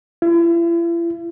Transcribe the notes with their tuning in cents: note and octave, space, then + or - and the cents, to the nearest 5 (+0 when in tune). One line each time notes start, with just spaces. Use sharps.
E4 +45